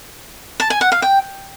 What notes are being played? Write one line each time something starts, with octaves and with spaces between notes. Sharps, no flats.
A5
G#5
F#5
F5
G5